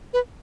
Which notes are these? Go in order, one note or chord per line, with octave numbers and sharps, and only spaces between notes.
B4